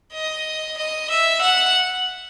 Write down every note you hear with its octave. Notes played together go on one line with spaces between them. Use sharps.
D#5
D#5
E5
F#5